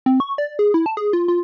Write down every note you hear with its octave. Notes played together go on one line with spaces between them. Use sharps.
C4
C#6
D5
G#4
E4
A5
G#4
F4
F4